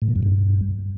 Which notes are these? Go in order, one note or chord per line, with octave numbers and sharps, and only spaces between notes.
A2
A#2
F#2
G2